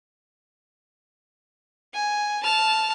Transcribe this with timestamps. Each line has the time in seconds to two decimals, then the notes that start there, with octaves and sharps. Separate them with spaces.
1.94 G#5
2.43 A5 F6